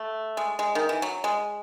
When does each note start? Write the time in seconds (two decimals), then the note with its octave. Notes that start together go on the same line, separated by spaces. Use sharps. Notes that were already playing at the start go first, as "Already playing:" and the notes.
Already playing: A3
0.37 G#3
0.59 G#3
0.75 D#3
0.89 E3
1.02 F#3
1.24 G#3